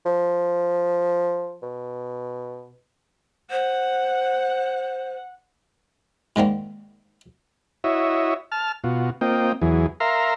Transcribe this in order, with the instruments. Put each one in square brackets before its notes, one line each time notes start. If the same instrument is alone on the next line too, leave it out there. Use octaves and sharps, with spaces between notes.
[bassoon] F3
B2
[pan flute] C5 [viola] F#5
[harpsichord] G#2 D3 D#3 A#3
[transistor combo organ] E4 F#4 C#5 D#5 E5
A5 F6
B2 F4 F#4
A#3 C4 F4 D#5 G5
E2 E3 F#3 G#4
A#4 E5 F5 A#5 C6